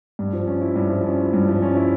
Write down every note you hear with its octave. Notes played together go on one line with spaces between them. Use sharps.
G2
F3
C#4
E4
G2
F3
C#4
E4
G2
F3
C#4
E4